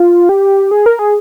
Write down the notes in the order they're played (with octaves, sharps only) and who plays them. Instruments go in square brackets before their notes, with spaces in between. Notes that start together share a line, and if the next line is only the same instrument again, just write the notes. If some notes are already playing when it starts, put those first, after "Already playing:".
Already playing: [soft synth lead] F4
G4
G#4
A#4
G#4